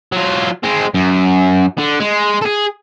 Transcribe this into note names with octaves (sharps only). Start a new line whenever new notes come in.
F#3 F4
G#3 C4
F#2
D3
G#3
G#4 A4